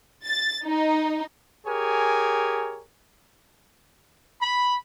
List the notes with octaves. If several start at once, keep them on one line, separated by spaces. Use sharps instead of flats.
A6
D#4
G4 G#4 A#4 C#5 G#5
B5